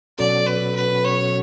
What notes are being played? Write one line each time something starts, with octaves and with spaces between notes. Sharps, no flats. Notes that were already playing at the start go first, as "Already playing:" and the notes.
B2 F#3 C#4 F#4 A4 D5
B4
B4
C#5